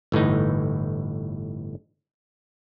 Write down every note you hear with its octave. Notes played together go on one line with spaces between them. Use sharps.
G1 A2 E3 D#4